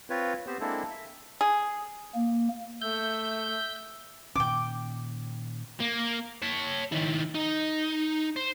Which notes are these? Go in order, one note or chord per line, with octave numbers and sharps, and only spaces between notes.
C4 F4 B4 C#5
B3 C4 G4 C5
G#3 A#3 C4 D4 E4 A4
E5
G#4
A#3
A3 E5 G6
A#2 D#3 C#4 G5 D6
A#3
C#5 A5
D#3 E4
D#4
C5